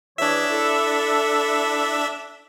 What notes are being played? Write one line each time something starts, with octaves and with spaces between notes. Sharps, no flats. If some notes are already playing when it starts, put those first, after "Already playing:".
E3 D4 G#4 C#5 E5
E4 A4